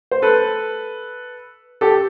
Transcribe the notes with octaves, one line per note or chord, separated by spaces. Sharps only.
C5
A4 B4
G4 A4